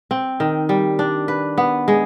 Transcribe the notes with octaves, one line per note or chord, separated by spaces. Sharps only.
C4
D#3
G3
D4
B4
B3
G#3